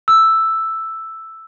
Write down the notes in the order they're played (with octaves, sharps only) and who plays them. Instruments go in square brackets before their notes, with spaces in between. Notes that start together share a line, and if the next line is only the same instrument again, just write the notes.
[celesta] E6